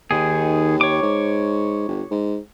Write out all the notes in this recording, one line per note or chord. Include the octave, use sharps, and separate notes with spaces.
D#2 D#3 G#4
C#5 D6
G#2
G1
G#2